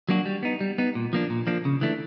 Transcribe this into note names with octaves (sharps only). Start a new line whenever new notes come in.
F#3 A#3 D4 F#4
G3
B3 D#4
G3
B3 D#4
A#2
F3 A#3 D4
A#2
F3 A#3 D4
C#3
E3 A3 D4